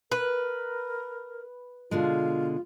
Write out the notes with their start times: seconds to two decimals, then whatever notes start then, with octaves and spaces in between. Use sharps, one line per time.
0.12 A#4 B4
1.91 B2 D3 G#3 F4